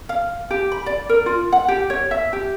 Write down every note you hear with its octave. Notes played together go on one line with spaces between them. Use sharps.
F5
G4
B5
D5
A#4
F4
F#5
G4
C#5
E5
G4